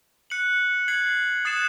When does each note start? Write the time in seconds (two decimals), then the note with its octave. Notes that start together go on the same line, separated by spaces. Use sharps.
0.30 F#6 C#7 F#7
0.88 G#6 C7 F#7
1.45 D#6 F#6 A6 C7 E7